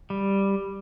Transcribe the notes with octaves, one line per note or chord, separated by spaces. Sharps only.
G3